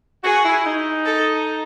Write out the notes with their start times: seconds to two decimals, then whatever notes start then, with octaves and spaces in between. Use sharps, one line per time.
0.23 F#4 G#4
0.44 E4
0.65 D#4
1.06 A4